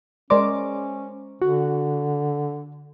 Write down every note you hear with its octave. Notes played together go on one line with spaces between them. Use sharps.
G#3 C#4 A#4 C5 D5 D6
D3 F#4